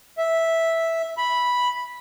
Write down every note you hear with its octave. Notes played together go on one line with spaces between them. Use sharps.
E5
B5